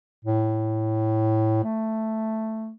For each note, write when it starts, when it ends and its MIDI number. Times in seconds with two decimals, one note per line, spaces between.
0.25 1.60 45
1.64 2.71 57